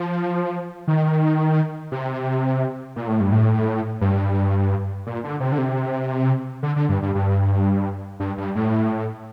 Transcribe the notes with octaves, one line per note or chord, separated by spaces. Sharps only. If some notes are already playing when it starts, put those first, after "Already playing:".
Already playing: F3
D#3
C3
A#2
A2
G2
A2
G2
A#2
D3
C3
D3
C3
D3
D3
G2
G2
G2
G2
G2
A2